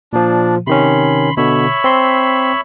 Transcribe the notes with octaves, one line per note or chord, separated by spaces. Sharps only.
A#2 F3 D4
C3 D#3 C#4 B5 C6
B2 D3 C#5 E5 B5
C4 C6 C7